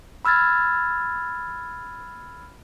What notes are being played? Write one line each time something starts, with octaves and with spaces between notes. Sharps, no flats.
B5 E6 F6 G#6 A6